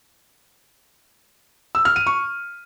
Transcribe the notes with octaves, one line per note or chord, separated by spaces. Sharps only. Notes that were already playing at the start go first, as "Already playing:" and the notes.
E6
F6
D#7
C#6